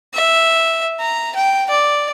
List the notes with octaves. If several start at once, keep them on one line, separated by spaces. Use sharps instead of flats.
E5
A#5
G5
D5